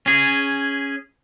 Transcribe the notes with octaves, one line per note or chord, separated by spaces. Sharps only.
C#4 G#4